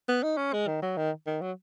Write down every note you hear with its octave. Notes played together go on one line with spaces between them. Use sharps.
B3
D#4
C#4
G#3
D#3
F#3
D#3
D#3
F#3